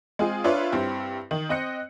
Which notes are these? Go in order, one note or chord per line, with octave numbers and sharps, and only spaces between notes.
G#3 C4 F4 G#4
D4 F4 B4 C#5 E5 F5
G2 C4 E4
D#3
C4 D#5 F#6 C#7